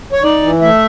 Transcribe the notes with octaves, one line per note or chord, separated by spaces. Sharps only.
C#5
D#4 D5
E3
A3 E5